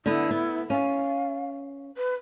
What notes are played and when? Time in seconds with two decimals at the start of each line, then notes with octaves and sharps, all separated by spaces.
0.06 D3 B3 E4
0.31 B3
0.70 C#4 F5
1.97 B4